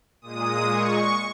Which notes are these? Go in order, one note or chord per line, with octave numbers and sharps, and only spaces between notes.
A#2 G#3 D#6
C#6